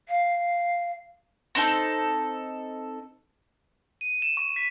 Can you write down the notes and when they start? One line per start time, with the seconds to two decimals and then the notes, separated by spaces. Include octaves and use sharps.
0.09 F5
1.55 C4 D#4 A4
4.01 D#7
4.22 E7
4.37 C#6
4.56 B6